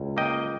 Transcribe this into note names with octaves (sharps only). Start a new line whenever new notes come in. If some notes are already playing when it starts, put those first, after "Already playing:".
Already playing: C#2
A#3 D#5 G5